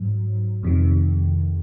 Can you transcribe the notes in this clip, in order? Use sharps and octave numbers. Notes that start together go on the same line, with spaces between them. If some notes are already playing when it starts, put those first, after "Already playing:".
Already playing: G#2 F#3
F2 C3 D#3